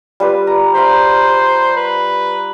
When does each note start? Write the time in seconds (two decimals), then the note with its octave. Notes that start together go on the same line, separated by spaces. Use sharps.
0.20 G3 F4 B4
0.47 A#5
0.75 C5 F5 A#5 B5
1.76 B4